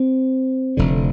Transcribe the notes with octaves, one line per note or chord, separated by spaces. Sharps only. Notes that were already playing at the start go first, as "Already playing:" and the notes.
Already playing: C4
F1 F2 D3